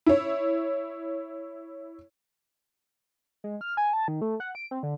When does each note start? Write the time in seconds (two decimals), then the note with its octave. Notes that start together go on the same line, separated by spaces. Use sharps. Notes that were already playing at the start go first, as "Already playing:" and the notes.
0.06 E4 C#5
3.44 G#3
3.61 F6
3.77 G#5
3.93 A5
4.08 D#3
4.21 A3
4.40 F#5
4.55 D7
4.71 C4
4.83 D3